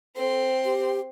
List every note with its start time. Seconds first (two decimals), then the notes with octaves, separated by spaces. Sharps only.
0.16 C4 A4 C6
0.64 G4